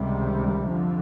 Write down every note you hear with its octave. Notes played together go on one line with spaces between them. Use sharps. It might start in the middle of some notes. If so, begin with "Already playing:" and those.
Already playing: C#2 C3 D#3 G3
F2 D3 F3